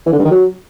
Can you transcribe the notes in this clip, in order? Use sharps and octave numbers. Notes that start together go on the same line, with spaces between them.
E3
D3
G2
D#3
F#3